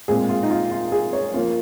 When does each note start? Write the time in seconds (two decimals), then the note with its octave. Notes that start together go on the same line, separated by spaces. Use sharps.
0.08 A#2 G#3 C4 G#4
0.29 F4
0.43 D#4
0.51 F4
0.71 F4
0.92 G#4
1.13 C#5
1.34 F3 A#3 C#4 F4